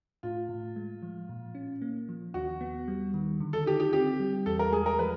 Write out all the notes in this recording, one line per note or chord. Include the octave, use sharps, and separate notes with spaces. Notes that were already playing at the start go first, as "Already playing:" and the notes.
A2 F4
A2
G#3
F3
A#2
C#4
A#3
F3
D#2 F#4
B3
G3
D#3
D3
A4
D#4 G4
G4
C4 G4
G3
E2 A4
A#4
G#3 G#4
A#4
F3 B4